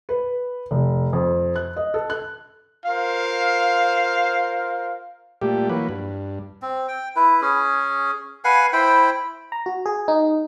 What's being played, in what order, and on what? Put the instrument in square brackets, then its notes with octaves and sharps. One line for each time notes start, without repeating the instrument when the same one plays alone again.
[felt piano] B4
F1
F2
F#6
D#5
A4
F#6
[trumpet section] F4 A#4 C5 F5
[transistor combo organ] A#2 G3 A3 G4
E3 F#3 A#3 B4
G2
[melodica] C4
G5
E4 B4
C#4 G#4
B4 F5 F#5 G#5
E4 C5 G5 B5
[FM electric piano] A#5
F#4
G#4
D#4